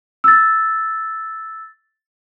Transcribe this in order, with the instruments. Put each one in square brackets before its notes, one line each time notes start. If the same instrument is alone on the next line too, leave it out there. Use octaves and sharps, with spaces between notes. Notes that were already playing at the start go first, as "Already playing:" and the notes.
[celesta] E6 A6